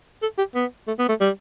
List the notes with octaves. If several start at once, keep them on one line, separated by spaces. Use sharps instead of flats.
A4
G4
B3
A3
B3
A3
G3